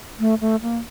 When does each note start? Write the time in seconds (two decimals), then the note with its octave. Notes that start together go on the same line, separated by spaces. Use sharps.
0.20 A3
0.41 A3
0.62 A#3